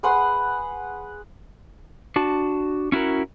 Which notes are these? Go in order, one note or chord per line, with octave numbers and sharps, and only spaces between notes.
G#4 B4 F#5 C6
D4 F#4 A5
C#4 E4 F#4 A#4